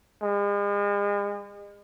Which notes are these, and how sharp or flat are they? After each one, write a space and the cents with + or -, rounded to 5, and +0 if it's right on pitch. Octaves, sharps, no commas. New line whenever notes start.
G#3 -40